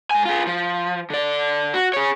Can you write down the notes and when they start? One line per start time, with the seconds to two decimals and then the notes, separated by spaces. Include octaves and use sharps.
0.11 G#2 G#5
0.25 F4 G#4
0.47 F3
1.10 D3 D5
1.74 F#4
1.94 G#4 C#5